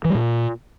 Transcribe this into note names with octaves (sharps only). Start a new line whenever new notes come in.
E3
G3
A#2